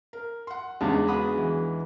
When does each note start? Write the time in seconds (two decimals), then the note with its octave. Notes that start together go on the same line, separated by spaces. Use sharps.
0.13 A#4
0.47 F#5 C6
0.81 E2 C#3 G#3 D4 D#4
1.07 B3 F#4 G#4 F#5 B5 D#6
1.37 E3